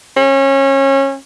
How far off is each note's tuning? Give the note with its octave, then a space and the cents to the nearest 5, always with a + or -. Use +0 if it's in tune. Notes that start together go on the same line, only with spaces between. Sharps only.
C#4 -25